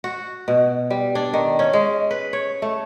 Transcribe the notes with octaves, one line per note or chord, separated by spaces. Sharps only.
F#4
B2
G3
D4
D#3
C#4
G#3
B4
C#5
A3